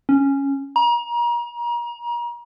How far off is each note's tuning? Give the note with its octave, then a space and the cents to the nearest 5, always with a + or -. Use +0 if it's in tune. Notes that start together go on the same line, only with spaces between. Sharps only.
C#4 -5
A#5 +35